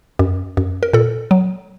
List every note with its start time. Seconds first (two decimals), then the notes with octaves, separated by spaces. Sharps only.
0.19 F#2
0.57 F#2
0.83 A#4
0.93 A#2 A4
1.31 F#3